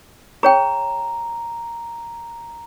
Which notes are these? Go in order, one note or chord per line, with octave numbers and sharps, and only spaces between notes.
G#4 C#5 G5 A#5